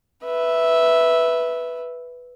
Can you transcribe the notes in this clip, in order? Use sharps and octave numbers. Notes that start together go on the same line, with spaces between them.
B4 E5